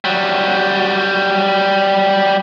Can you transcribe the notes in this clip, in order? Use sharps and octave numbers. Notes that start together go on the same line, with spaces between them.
F#3 G3